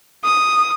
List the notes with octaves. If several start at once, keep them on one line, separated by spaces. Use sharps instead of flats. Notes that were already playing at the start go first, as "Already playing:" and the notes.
D#6